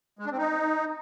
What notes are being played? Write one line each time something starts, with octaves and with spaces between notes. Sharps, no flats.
G#3
D4
C4
D#4